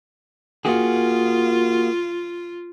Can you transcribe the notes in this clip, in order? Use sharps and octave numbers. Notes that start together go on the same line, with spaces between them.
A#3 F4 F#4 G#4